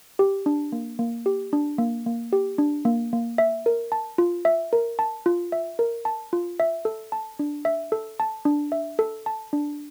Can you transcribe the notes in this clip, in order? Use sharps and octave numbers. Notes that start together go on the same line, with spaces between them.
G4
D4
A#3
A#3
G4
D4
A#3
A#3
G4
D4
A#3
A#3
E5
A#4
A5
F4
E5
A#4
A5
F4
E5
A#4
A5
F4
E5
A4
A5
D4
E5
A4
A5
D4
E5
A4
A5
D4